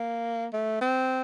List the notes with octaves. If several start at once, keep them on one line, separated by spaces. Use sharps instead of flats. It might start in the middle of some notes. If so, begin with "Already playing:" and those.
Already playing: A#3
A3
C4